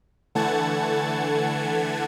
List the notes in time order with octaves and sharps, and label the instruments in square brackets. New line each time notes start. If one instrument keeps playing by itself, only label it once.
[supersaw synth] D3 E3 A3 F#5 A5 G#6